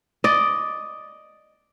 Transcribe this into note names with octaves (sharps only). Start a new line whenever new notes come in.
D5 D#5